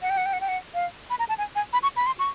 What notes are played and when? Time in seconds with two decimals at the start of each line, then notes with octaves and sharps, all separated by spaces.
0.02 F#5
0.10 G5
0.17 F#5
0.26 G5
0.33 F#5
0.41 G5
0.48 F#5
0.74 F5
1.10 B5
1.19 A#5
1.29 A5
1.38 G#5
1.55 G#5
1.73 B5
1.83 C#6
1.97 B5
2.07 C6
2.19 C#6